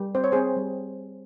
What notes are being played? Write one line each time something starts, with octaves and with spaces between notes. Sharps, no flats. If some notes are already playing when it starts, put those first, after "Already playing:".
Already playing: G3
C4 C5
C#5
C4 G#4 C5
G3